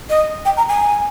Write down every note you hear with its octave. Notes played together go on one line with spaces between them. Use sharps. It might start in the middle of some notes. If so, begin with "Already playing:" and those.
D#5
G5
A#5
G#5